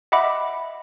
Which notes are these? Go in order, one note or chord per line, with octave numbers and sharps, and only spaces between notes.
D#5 E5 F#5 B5 D6